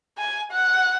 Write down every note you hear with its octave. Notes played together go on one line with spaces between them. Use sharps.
G#5
F#5